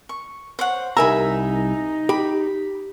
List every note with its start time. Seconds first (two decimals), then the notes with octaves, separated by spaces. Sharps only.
0.09 C#6
0.59 C5 C#5 F#5
0.97 C2 D#4 A#4 E5 G#5 A#5 B5
2.09 G4 B5